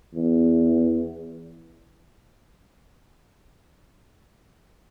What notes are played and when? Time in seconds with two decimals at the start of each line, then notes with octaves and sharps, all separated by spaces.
0.14 E2